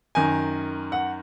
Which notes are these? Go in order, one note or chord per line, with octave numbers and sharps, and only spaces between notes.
F#2 D#3 G#5
F#5